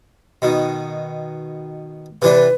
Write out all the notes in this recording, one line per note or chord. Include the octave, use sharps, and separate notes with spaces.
B2 D#3
C3 E3 D4 B4